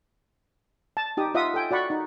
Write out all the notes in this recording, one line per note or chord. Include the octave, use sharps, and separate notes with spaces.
A5
D#4 G4 D#6
F4 D#5 E5 F#5 D#6
A4 G5 G#5
F#4 D5 F#5 B5 C#6
D#4